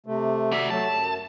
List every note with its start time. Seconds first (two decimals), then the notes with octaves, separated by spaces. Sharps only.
0.06 C3 A3
0.52 F#4 D5 E5
0.70 F#3 A3 A5
0.93 F#2